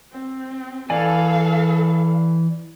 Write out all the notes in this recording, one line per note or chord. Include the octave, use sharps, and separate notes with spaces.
C4
E3 A4 D5 F5 G#5